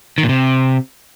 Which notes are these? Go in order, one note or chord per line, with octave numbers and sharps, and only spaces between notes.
D#3
A#2
C3